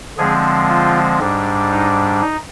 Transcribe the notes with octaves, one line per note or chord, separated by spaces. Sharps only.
D3 F3 G#3 C4 G#4
F4
G#2 G3 D4
D#4
D#4